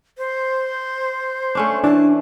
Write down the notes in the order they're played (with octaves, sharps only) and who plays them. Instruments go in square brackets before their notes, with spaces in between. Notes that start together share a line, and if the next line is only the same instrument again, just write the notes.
[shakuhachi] C5
[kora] A3 C#4 D4
[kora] E3 [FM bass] D4 [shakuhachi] A5